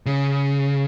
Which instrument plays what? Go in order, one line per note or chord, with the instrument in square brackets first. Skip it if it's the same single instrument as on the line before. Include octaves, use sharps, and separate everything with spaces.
[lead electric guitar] C#3